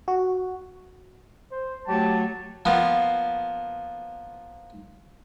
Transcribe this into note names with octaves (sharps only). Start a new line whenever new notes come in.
F#4
C5
F#3 A3 G4 C#5 A5
F3 A#3 B3